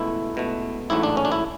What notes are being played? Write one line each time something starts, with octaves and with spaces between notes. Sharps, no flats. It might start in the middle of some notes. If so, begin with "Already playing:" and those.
Already playing: C#2 B2 A3 E4
C#2 B2 A3
A1 G#2 F#3 A3 E4
D4
C#4
D4
E4